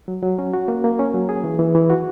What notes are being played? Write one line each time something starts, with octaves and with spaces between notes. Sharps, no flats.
F#3
F#3
C#4
F#4
A#3
A#3
C#4
F#3
G#4
E3
E3
E3
F#4